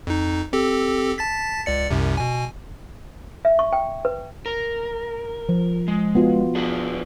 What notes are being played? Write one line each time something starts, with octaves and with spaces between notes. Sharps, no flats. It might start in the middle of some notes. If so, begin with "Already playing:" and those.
F2 D#4
C4 G4 A4
A5 A6 B6
C#2 D5 C#7
C2 F#2 C3
B2 G#5
E5
C#6
G5
B4
A#4
F3
G#3
B3 F4 F#4
D4 G#4 B4